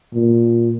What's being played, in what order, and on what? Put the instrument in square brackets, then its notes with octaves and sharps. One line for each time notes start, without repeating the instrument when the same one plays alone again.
[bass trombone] A#2